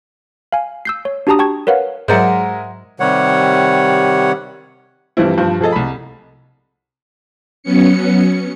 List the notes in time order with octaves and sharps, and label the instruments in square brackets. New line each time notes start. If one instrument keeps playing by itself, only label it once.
[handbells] F5 G#5
E6 G6 C7
C#5
D4 F#4 G4 A5 A#5 D#6
G5 A5 C#6 G#6
A#4 B4 C#5 F5 F#5
[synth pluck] G#2 F#3 [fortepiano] G#3 A#4 E5 [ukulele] C5 D5 F#5
[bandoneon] C3 D#3 G3 C#5 F#5
[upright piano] G2 E3 F3 G3 C4 E4
G2 F3 C5
F3 G#4 A4 D#5
C2 B5
[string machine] F#3 B3 C#4 C#7